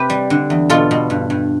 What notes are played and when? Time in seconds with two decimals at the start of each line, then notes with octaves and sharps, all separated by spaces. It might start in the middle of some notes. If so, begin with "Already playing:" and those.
Already playing: C3 G4 B4
0.10 G3
0.30 D3
0.50 E2
0.70 B2 F4 A4
0.91 B2
1.10 G2
1.30 G2